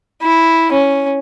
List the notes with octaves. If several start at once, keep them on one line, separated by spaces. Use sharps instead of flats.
E4
C#4